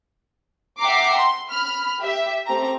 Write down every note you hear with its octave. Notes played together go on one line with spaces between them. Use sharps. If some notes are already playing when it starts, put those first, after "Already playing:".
E5 F#5 G5 A#5 D6 C7
C6
B5 F6
G4 E5
A3 C4 G4 A#5